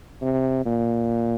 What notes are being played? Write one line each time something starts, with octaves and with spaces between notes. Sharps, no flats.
C3
A#2